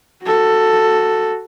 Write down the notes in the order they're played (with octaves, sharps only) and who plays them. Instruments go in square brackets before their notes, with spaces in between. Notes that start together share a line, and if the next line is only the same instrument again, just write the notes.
[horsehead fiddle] F#4 A4